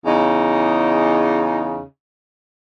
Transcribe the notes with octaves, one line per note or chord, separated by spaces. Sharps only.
E2 C#3 D#4